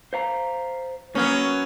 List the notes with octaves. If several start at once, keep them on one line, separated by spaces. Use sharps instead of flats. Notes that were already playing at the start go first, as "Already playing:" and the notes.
C5 F5 A#5
F#3 A#3 B3 C#4